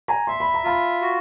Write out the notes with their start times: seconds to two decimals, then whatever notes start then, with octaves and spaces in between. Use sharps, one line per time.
0.08 G#5 A#5
0.27 E5 C6
0.40 B5
0.54 A#5
0.64 F4 A5 B5
1.01 F#4